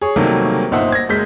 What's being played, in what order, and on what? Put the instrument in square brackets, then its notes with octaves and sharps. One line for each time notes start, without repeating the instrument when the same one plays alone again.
[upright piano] G#4 C#5
C3 D#3 F#3 G3 A3 A#3
G1 A#2 D#4 C5 E5 F#5
G#6 A#6
F#1 G#3 G6 B6